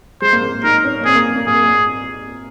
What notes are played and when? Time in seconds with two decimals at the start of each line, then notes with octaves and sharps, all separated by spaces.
0.22 G#3 C5
0.33 A#3
0.43 A#3
0.64 D#4 A#4
0.85 C#4
1.01 A#3
1.05 C4 G#4
1.15 A#3
1.36 A#3
1.47 A#3 G#4